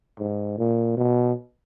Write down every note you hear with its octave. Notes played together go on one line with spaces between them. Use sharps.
G#2
A#2
B2